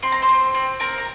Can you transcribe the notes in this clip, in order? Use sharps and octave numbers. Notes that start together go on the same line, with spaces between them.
C4 C6
A#5
C5 C6
C4
C4
C4 A#4 A#5
A#5